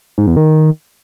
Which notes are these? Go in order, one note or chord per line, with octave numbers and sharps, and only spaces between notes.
G#2
E2
D#3